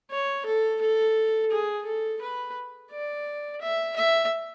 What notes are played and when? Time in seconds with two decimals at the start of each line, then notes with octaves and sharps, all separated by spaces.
0.11 C#5
0.46 A4
0.81 A4
1.51 G#4
1.85 A4
2.22 B4
2.92 D5
3.61 E5
3.96 E5